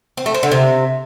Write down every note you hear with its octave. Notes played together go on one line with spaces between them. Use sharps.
C4
A3
C4
D3
C3